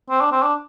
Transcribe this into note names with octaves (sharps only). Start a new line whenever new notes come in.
C4
D4
C4
D4